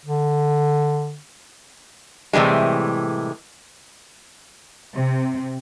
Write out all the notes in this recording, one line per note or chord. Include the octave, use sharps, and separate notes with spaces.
D3
A2 C3 E3 G3 G#3
C3